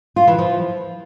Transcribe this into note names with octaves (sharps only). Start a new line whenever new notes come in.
F4
E3
F3